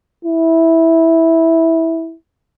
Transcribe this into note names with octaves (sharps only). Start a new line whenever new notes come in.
E4